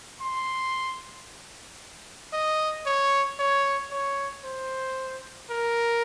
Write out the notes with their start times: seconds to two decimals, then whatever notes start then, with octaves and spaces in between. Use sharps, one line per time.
0.21 C6
2.33 D#5
2.86 C#5
3.40 C#5
3.91 C#5
4.44 C5
5.51 A#4